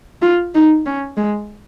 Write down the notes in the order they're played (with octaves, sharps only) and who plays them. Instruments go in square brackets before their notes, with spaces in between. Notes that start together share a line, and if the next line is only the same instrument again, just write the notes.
[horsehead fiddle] F4
D#4
C#4
G#3